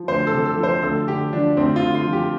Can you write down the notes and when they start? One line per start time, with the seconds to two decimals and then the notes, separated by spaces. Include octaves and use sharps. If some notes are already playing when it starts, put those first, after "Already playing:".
Already playing: F3
0.08 D2 C5
0.27 A4
0.33 C3
0.46 A4
0.57 F3
0.63 C5
0.83 D2 A4
1.08 D3 G4
1.33 F3 D4
1.57 D2 C4
1.76 F4
1.82 D3
1.95 F4
2.07 F3
2.13 G4